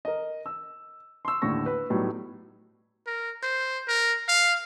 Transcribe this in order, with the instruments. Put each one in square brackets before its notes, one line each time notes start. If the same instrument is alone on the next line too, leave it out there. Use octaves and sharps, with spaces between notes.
[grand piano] A#4 D#5
E6
C6 C#6 E6
D#2 A2 D3 C#6 A#6
B4
A2 F#3 G3 B3 D#4
[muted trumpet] A#4
C5
A#4
F5